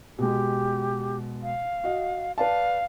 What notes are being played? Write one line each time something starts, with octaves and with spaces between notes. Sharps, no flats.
B2 G#3 G4
F5
F#4 D#5
B4 D5 F5 A5